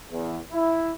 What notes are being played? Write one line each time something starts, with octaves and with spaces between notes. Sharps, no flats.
E2
E4